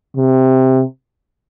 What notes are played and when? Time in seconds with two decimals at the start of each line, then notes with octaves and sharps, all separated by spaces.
0.17 C3